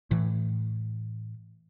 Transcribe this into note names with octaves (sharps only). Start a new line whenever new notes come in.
A2 E3